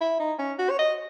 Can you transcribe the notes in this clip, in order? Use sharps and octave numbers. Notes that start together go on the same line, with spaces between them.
E4
D#4
C#4
F#4
C#5
D#5